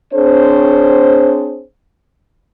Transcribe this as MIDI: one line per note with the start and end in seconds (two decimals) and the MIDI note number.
0.12 1.61 60
0.12 1.61 62
0.12 1.61 68
0.12 1.61 72
0.12 1.61 73